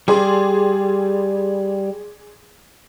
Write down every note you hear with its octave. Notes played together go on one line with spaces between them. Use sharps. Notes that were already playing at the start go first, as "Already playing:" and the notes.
G3 G#4 D5 C6